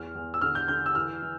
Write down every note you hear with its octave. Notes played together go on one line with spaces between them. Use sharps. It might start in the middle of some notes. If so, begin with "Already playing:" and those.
Already playing: E2 F6
E2
E6
D3 F6
G6
D3 G6
E6
E3 F6
E3